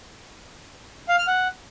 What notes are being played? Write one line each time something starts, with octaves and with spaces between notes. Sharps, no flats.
F5
F6
F#5